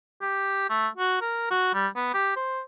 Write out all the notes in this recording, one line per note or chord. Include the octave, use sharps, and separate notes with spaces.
G4
A3
F#4
A#4
F#4
G3
B3
G4
C5